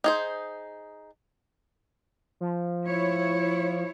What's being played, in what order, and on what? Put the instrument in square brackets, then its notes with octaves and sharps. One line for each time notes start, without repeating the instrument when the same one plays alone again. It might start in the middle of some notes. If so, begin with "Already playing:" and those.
[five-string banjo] D#4 G#4 C5
[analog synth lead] F3
[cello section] E4 C#5